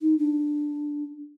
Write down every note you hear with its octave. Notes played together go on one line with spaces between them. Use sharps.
D#4
D4